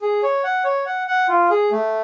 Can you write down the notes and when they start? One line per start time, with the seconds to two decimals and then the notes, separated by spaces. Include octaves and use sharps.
0.02 G#4
0.23 C#5
0.44 F#5
0.64 C#5
0.86 F#5
1.08 F#5
1.28 F4
1.50 G#4
1.71 A3